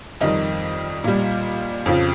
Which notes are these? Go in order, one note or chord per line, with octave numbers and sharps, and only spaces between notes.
F2 D#3 G3 D#5
A#2 G3
F2 C#3 F3